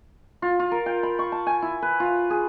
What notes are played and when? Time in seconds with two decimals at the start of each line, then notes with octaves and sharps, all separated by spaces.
0.42 F4
0.59 F4
0.72 A#4
0.86 G5
1.03 B5
1.19 C#6
1.32 A5
1.46 G#5
1.62 E4
1.82 B4
2.00 F4
2.30 G#4